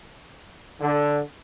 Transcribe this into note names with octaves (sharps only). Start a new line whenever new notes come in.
D3